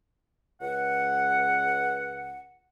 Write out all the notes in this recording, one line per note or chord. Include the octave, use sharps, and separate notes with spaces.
C#2 F#5